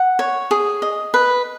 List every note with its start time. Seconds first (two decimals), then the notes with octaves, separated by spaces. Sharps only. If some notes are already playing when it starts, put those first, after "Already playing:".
Already playing: F#5
0.19 C#5
0.51 G#4
0.82 D#5
1.14 B4